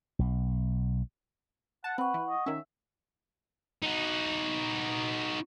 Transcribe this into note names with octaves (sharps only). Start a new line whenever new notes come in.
B1
F#5 A5
C4 B4 F#5 C#6
E3
D#5
D#3 C#4 E5
D#4 F#4